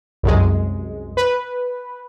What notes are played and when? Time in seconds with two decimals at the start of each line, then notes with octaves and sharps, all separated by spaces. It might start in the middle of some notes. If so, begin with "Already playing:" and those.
0.23 C2 F#2 G#3
1.17 B4